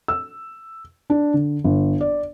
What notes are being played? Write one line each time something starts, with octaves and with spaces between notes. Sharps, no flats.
E6
D4
D3
G1
D5